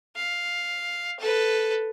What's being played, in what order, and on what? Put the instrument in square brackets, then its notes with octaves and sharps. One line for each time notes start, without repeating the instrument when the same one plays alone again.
[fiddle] F5
A4 B4